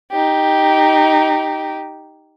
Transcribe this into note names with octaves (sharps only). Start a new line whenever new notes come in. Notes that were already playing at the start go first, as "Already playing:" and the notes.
D#4 G4